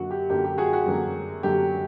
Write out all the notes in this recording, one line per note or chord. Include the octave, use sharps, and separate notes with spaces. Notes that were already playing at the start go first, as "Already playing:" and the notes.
Already playing: F#2 D3 F#3 A#3 F#4
G4
F#2 D3 F#3 A#3 G4
G4
F#4 G#4
F#4
F#2 D3 F#3 A#3
F#2 D3 F#3 A#3 G4